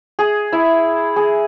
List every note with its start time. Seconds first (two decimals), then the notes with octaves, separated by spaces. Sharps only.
0.19 G#4
0.52 E4
1.16 G#4